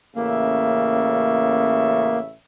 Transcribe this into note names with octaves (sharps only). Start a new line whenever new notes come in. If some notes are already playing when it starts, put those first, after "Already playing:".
A1 C#3 A#3 E5